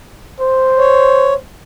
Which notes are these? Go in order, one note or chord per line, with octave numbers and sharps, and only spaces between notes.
C5
C#5